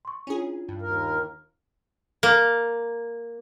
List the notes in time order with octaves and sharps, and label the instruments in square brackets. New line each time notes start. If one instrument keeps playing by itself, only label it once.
[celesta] C6 C#6
[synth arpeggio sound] C#4 G#4 [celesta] D4 E4 F4
[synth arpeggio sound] G2
[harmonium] D#2 A#4
[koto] A#3